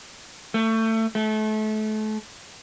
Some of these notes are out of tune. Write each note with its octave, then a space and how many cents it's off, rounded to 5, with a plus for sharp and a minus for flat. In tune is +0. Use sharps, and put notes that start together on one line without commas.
A3 +25
A3 -30